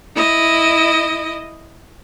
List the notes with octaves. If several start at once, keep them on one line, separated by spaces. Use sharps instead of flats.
E4 D#5